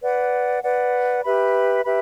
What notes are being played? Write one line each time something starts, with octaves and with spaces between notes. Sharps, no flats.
B4 D5 F#5
B4 D5 F#5
G4 B4 E5 B5
G4 B4 E5 B5